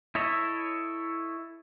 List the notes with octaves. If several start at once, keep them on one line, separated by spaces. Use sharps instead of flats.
E4 A4 C#5 D#5 E5